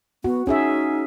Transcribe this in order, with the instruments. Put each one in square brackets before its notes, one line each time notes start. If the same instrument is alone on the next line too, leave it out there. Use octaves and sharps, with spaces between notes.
[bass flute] B3 [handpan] F#4
[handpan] C#4 G#4 E5 [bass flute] D#4